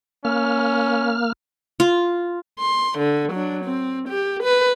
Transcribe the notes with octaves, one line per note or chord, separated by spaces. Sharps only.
A#3 C#4 F6
F4
C6
D3
F#3 D4
C4
G4
B4